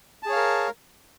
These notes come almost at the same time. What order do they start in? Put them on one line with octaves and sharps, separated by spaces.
A5 G#4 C#5 F5 A#4